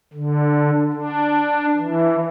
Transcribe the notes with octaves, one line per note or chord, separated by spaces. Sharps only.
D3
D4
E3